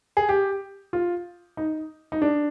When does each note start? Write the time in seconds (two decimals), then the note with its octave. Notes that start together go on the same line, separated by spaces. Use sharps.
0.17 G#4
0.29 G4
0.93 F4
1.57 D#4
2.12 D#4
2.22 D4